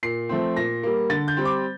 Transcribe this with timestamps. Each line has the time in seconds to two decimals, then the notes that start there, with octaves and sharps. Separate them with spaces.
0.03 A#2 C7
0.29 F3 A3 C4
0.56 A#2 A#6
0.83 G3 A#3
1.10 D3 A6
1.28 G6
1.37 G3 C4
1.45 D6